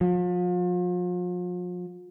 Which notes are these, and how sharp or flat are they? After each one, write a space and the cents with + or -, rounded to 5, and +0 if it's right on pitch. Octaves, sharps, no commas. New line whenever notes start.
F3 +40